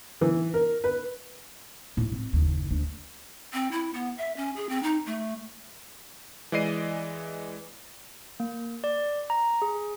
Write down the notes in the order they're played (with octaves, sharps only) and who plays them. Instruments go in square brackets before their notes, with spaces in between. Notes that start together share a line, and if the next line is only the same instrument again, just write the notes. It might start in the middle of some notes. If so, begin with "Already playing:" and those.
[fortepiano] E3
A#4
B4
[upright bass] A2
C4
F#1 D#2
D2
[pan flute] C4
E4
B3
E5
C#4
G#4
C4
D#4
A3
[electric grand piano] E3 G#3 D5 D#5 C7 D#7
[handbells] A#3
D5
A#5
G#4